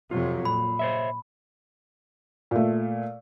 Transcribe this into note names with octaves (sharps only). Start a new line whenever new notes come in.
F2 C3 F#3 F4
A#2 B5
C5 C#5 E5
A#2 A3